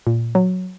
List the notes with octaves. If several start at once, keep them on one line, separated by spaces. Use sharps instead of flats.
A#2
F#3